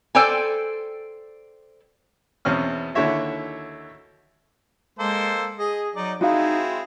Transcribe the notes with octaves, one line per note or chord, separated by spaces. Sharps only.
A4 C5 D5 G5 G#5
E2 B2 C4 C#4 F6
D#2 D3 E4 F#4 C#5 E5
G#3 A#3 A4 C5
G#4 D#5
F#3 D#4 D5
G#3 C4 D#4 E4 F#4 F5